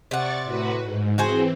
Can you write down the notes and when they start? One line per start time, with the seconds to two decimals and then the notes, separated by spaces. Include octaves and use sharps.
0.11 C3 D5 F#5 C#6 A6
0.44 A2 F#4 B4
0.82 G#2
1.18 E3 C4 F#4 G#4 C5